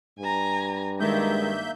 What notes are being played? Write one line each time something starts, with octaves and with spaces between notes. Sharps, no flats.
G2 G#5 A#5
D#3 G#3 A#3 E5 G6